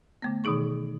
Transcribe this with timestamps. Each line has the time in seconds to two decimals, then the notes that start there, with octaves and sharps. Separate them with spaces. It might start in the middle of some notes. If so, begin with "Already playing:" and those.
0.22 D3 A3 B3
0.44 B2 D#3 E3 D#4 G#4 C#6